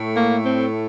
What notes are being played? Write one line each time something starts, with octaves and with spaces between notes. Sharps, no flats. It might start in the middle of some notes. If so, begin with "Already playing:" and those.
Already playing: A2 A3
A#3
C4